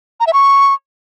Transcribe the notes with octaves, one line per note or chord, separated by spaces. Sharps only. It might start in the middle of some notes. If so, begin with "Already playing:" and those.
A#5
E5
C#6